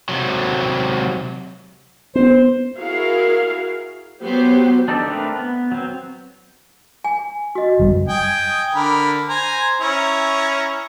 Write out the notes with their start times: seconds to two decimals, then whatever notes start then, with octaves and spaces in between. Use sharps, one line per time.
0.09 C3 F#3
2.15 B3 C5
2.77 E4 F#4 G#4 A#4 F5
4.20 F#3 B3 G4 C5
4.88 D4 D#4 G4 A4 D5
5.07 A3 C4 D4 A#4 B4
5.36 B3
5.72 F#3 C4
7.04 G#5
7.55 F#4 D#5
7.79 F#1 F#2 G3
8.08 D#5 G5 G#5
8.74 D3 A#4 B5
9.29 C5 G#5 A#5
9.80 C#4 E4 A#5